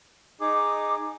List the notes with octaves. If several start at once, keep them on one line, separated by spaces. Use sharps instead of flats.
D#4 G#4 D6